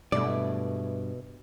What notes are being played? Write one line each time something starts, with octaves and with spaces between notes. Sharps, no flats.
G2 B2 G#3 A3 E4 D5